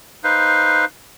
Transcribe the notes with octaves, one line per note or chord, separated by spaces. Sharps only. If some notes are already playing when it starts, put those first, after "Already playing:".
D#4 B4 C5 F5